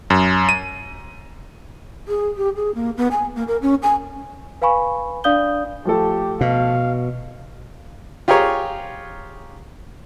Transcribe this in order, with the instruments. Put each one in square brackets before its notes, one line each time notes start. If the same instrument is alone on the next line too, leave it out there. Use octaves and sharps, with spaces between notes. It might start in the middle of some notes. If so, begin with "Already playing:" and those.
[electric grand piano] F#2
D#7
[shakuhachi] G#4
G4
G#4
A#3
B3
G#5
A#3
A#4
C#4
G#5
[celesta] B4 F5 G#5 B5 C#6
D4 D5 F5 D#6 G6 G7
[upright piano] F3 A3 A4 [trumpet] G4
[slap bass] B2 [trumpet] F5
[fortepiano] F4 G4 G#4 A#4 C#5